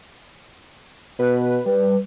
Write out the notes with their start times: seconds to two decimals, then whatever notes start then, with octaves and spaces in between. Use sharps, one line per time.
1.19 B2 B4
1.66 G3 B4